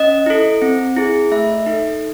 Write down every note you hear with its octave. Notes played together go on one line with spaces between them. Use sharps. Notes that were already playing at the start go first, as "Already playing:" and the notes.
Already playing: C#4 D#5
E4 A4
C4
E4 G#4
A3 E5
D#4 A4